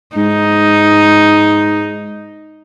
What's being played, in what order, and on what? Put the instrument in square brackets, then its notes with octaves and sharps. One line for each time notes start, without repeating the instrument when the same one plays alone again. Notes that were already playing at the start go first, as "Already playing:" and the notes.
[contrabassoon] G#2 [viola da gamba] D#4